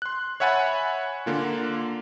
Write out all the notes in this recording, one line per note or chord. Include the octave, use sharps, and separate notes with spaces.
C6 F#6
C#5 E5 F#5 G#5 B5 A6
D3 A#3 F4